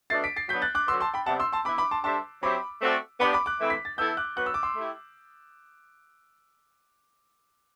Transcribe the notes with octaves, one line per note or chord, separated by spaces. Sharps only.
B2 A3 D4 A4 A6 C7
B6 D7
A6 C7
F#3 B3 D4 G6 B6
F#6 A6
D6 F#6
D3 F#3 B3 F#4 B4 C6 E6
A5 C6
G5 B5
C3 G3 B3 F#5 A5
C6 E6
A5 C6
E3 B3 E4 B4 B5 D6
B5 D6
A5 C6
G3 D4 A4 C5 E5 A5 C6
F#3 C4 G4 C5 E5 B5 D6
A3 C4 F#4 A4 D5
B3 D4 G4 B5 D6
B5 D6
D6 F#6
E3 A3 C4 E4
B6
A6
E3 B3 E4 A4 E6 G6
D6 F#6
F#3 B3 F#4 B4 F#6
E6
D6
C6 E6
A3 E4 G4